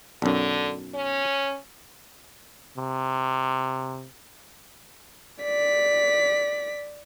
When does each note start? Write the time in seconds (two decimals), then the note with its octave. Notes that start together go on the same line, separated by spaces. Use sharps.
0.22 B1 F#2 D3
0.94 C#4
2.77 C3
5.43 D5 B6